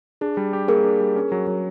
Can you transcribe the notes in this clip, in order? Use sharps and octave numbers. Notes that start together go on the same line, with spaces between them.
D4 G#4
G3
G4
A#3 G#4 A#4
D4
G3
C#4
F#3
F#3